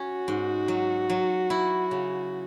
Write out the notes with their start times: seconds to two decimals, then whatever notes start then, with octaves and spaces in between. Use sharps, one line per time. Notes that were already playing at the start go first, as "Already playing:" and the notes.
Already playing: C#4 F#4
0.28 G#2
0.68 F#3
1.09 F#3
1.50 E4
1.91 C#3